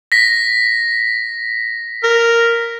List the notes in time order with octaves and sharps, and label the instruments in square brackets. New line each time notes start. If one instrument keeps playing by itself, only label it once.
[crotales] A#6 B6
[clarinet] A#4